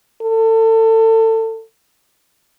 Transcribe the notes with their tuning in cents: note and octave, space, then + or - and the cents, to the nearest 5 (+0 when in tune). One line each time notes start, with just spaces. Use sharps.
A4 +30